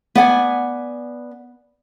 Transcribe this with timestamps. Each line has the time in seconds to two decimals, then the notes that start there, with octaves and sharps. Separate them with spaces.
0.15 B3 D5 F#5 G#5